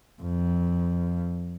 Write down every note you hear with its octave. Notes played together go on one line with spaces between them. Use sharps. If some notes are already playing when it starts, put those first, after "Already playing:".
F2